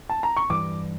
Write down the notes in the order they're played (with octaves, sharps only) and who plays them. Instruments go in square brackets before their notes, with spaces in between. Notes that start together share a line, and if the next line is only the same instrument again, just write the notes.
[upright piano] A5
A#5
C#6
[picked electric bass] G2 E3 G3 [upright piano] D6